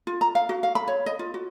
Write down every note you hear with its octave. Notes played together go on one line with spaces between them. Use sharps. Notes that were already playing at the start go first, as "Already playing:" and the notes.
F4
A#5
F5
F#4
F5
B5
C#5
D#5
F4
F#4